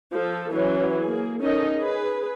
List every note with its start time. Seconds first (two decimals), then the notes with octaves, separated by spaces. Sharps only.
0.13 F3 A4
0.51 E3 F#3 C#4
1.03 A#3 G#4
1.41 C#4 D#4 A4 A#4 D#5
1.76 G#4 B4